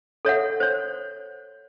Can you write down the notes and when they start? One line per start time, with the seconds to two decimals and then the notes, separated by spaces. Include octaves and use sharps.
0.25 A4 C#5 E5 F#5
0.60 C5 C#5